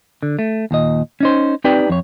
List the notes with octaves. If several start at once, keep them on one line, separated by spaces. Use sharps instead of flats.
D3
A3
D#2 A#2 D#5
C#4 D#4 C5
C4 D#4 G4 B4 D5 G5
F2 C#5